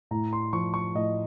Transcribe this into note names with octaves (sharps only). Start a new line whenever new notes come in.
A2 A#5
C6
F3 C#6
C#6
A2 D#5